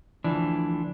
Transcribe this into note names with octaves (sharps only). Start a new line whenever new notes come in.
D2 E3 F3 D4